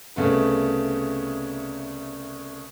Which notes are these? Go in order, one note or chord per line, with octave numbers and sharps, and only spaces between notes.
C2 C#3 A3 B3